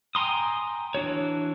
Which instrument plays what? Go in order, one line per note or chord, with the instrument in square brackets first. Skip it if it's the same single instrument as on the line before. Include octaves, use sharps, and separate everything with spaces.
[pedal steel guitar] G5 G#5 A#5 C6 D#6
E3 D4 F#4 C#5